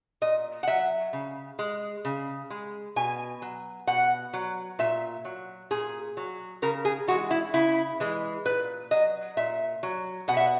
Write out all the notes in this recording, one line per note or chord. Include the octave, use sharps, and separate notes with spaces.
A#2 D#5
F#5
F#3 E5
C#3
G#3
C#3
G#3
B2 G#5
F#3
B2 F#5
F#3
A#2 E5
F#3
A#2 G#4
F#3
C#3 A#4
G#4
E3 G#3 F#4
E4
C#3 E4
E3 G#3
A#2 B4
F#3 D#5
A#2 E5
F#3
B2 F#5
E5